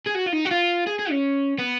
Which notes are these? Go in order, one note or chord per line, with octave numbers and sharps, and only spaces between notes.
G#4
F#4
F4
D#4
F#4
F4
G#4
G#4
C#4
B3